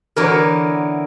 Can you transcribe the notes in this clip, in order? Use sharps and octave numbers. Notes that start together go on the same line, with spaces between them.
D3 E3 B3 A#4 C#5